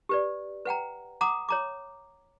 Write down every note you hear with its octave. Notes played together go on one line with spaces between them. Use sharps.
G4 B4 D5
B4 F#5 G5 A#5
F#5 A#5 D6 D#6
C#5 A#5 D6